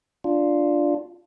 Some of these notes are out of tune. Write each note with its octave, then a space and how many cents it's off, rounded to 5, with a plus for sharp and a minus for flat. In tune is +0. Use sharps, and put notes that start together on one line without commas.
D4 +0 F4 +0